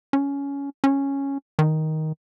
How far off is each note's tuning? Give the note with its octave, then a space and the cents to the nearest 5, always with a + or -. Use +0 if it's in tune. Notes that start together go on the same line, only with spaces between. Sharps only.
C#4 +15
C#4 -5
D#3 +10